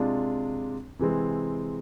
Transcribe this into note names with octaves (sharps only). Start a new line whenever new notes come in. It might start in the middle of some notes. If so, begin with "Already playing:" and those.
Already playing: C3 G#3 D4 F4
C3 E3 G#3 C4